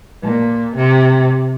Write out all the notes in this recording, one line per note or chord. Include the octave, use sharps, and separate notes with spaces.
A#2
C3